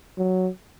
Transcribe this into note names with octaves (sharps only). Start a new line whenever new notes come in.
F#3